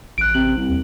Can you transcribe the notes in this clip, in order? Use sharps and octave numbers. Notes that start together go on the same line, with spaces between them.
A1 F#6 D7
C3 F#7
C2
D#2